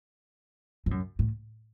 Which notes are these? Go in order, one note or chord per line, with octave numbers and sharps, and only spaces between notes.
G#2
F#2
A2